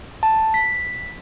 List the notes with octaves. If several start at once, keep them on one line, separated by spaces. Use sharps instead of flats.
A5
B6